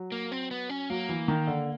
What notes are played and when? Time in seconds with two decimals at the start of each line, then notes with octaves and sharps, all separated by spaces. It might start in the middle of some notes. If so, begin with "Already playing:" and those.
Already playing: F#3
0.12 A#3
0.32 C4
0.51 B3
0.70 C#4
0.90 F#3 A#3
1.09 E3
1.28 D#3
1.47 D3